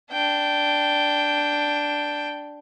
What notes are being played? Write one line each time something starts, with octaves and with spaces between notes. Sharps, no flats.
D4 G5